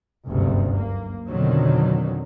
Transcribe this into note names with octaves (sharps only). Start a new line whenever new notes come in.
F#1 D2 G2 C3
A#3
F2 B2 D3 D#3 F#3